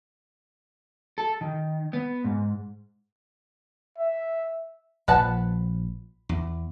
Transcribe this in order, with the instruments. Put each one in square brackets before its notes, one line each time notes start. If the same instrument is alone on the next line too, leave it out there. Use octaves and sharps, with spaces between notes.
[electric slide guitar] A4
D#3
B3
G#2
[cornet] E5
[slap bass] A#1 F3 [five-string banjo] B4 F#5 A5
[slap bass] E2